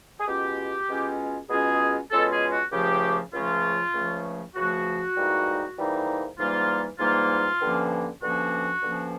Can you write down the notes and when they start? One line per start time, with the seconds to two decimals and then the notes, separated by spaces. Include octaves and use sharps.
0.20 G#4
0.28 B2 G#3 C#4 F4 G4
0.89 B2 G#3 C#4 F4
1.50 B2 G#3 C#4 F4 G#4
2.11 B2 G#3 C#4 F4 A4
2.31 G#4
2.52 F#4
2.72 C#2 C#3 F3 A3 G4
3.33 C#2 C#3 F3 A3 F4
3.94 C#2 C#3 F3 A3
4.55 C#2 C#3 F3 A3 F#4
5.16 G#2 E3 G3 A#3 D#4
5.77 G#2 E3 G3 A#3 D#4
6.39 G#2 E3 G3 A#3 D#4 F4
6.99 G#2 E3 G3 A#3 D#4 F4
7.61 G2 D3 F3 A#3 C#4
8.22 G2 D3 F3 A#3 C#4 F#4
8.83 G2 D3 F3 A#3 C#4